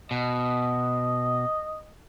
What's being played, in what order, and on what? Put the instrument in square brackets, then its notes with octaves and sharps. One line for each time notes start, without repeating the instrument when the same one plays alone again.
[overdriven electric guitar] B2 [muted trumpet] D#5